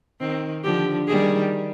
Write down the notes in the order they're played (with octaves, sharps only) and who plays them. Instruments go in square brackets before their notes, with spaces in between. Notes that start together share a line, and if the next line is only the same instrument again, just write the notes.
[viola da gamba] D#3 [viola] C4
[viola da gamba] D3 F3 [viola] G4
[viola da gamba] D#3 G3 [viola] G#4